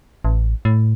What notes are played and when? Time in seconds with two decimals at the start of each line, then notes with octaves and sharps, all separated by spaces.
0.25 A1
0.65 A2